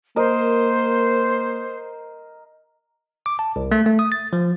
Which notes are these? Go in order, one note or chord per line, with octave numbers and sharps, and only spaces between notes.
A#3 A#4 C5 D#5
D6
A5
C2
A3
A3
D#6
A6
F3